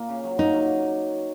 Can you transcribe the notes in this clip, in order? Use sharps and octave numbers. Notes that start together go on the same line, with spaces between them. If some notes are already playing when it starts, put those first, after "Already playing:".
Already playing: A#2 A#3
C#3
F#3
A#3 D#4
F#3